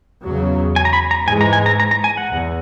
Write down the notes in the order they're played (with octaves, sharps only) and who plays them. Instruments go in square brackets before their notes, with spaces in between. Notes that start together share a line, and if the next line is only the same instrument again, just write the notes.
[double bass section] E2 C#3 F#3
[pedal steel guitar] G#5
A#5
B5
A#5
[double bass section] G#2 E3 G#3 [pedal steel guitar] G#5
[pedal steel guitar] A#5
G#5
A#5
A#5
A#5
G#5
F#5
[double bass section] E2